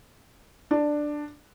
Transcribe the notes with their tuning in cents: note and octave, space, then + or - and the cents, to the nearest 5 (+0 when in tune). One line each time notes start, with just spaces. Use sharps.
D4 +10